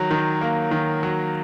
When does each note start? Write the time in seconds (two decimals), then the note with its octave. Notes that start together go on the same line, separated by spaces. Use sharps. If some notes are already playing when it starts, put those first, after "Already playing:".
Already playing: D#3 F#3
0.11 D#3
0.41 A#3
0.71 D#3
1.03 F#3